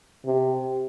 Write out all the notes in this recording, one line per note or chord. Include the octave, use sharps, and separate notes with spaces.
C3